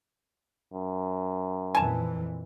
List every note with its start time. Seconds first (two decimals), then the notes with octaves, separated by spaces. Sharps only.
0.74 F#2
1.75 F2 A#2 E3 G#5 A5